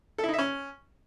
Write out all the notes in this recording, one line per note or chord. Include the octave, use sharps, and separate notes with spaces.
A4
E4
D#4
E5
C#4